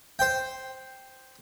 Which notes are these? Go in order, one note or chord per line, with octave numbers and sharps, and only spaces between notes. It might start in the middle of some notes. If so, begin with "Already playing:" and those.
C5 G5